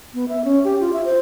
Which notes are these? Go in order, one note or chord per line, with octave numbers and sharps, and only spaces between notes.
B3
E5
C#4
G4
F4
E5
C5